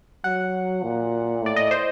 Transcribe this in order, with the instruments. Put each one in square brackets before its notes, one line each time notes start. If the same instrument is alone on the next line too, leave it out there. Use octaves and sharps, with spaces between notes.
[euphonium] F#3 [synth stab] F#5
[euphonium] A#2
[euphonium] A2 [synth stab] D5
[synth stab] D#5
C5